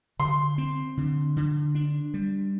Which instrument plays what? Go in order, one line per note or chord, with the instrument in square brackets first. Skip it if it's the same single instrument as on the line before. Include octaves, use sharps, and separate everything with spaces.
[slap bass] D3 [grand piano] C6
[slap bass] C4
D3
D3
D4
G3